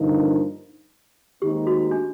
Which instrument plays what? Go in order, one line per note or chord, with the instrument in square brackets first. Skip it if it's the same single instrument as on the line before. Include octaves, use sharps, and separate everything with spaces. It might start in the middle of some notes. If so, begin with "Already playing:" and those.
Already playing: [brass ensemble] G2 D3 F3 A#3 D#4
[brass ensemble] D#2 D#3 G#3 C4 D#4 [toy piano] G4
[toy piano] F#4
D4